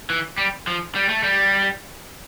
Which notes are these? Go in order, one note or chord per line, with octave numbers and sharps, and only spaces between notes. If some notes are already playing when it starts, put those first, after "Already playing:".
E3
G3
F3
G3
A3
G3